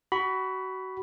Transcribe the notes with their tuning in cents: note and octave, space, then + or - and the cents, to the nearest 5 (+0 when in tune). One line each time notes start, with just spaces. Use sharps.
F#4 +25 B5 +0